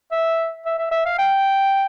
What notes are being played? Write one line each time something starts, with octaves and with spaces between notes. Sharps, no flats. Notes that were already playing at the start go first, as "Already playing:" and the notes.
E5
E5
E5
E5
F5
G5